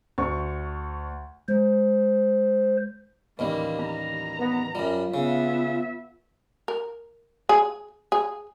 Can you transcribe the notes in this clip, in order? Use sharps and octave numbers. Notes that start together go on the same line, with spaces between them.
D2 C#6
G#3 C5
A1 D#2 G3 A#3
A#5
B3
F#2 G3 F4
C#3 B3 E5
A#4
G#4
G#4